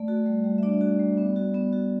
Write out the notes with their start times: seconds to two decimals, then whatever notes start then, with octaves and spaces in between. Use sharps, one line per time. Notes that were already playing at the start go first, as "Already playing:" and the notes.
Already playing: A3 D5
0.08 F#4
0.26 G3
0.44 G3
0.58 E5
0.63 D4 D5
0.81 F#4
1.00 G3
1.17 B3
1.36 F#4
1.55 B3
1.73 F#4